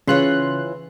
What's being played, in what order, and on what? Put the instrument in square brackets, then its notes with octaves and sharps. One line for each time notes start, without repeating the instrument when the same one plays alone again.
[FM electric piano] C#3 C6 F#6 [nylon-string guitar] E3 F4 C#5